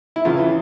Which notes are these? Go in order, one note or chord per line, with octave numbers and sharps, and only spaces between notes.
E4
E2 C#3 E3 F4